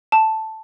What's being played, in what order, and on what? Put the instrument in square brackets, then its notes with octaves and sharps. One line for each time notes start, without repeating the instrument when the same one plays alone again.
[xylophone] A5